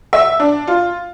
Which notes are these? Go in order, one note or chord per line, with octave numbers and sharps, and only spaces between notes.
E5
D4
F4